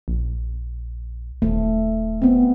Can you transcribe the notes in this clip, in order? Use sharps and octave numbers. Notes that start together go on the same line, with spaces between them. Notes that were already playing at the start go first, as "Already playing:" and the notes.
A#1
D#1 A3
B3 C4